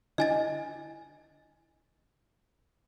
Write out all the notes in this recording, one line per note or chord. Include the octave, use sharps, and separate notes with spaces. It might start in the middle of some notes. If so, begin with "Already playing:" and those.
D3 D4 E4 D#5 G#5 A6